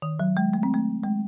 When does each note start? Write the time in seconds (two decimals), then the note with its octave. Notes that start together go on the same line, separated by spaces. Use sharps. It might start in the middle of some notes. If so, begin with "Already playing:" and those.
0.02 D#3
0.20 F#3
0.37 G#3
0.54 A3
0.63 C4
0.74 A3
1.03 G#3